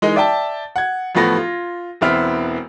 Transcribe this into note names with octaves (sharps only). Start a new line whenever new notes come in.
E3 G#3 D#4 A#4 D#5
D5 E5 G5 A5
F#5 G#6
A1 F3 A3 B3 A#6
F4
E1 E3 B3 C4 E5 F6